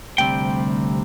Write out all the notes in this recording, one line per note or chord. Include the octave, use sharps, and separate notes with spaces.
D2 C3 G3 C4 G5